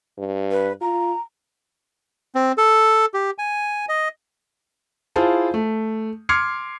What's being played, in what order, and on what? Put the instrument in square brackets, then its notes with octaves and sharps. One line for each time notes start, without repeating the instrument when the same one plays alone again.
[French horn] G2
[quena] B4
[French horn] F4 [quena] A#5
[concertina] C4
A4
G4
G#5
D#5
[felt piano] E4 F4 G#4 C5 F5 A5
A3
C6 D6 F6 G#6 C7 C#7